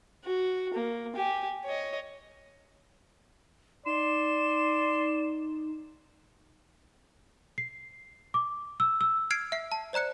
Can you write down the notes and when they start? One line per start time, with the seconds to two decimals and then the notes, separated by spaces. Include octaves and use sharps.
0.24 F#4
0.74 A#3
1.15 G4 G#5
1.65 C#5 D#5
3.86 D#4 D5 C6 E7
7.58 C7
8.34 D6
8.80 E6
9.01 E6
9.30 F6 G#6 C7 D7
9.52 E5 C7
9.72 A5
9.93 C5 D5 A#5 F#6 C#7